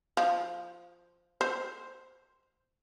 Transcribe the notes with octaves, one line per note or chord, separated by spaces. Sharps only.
F3
C5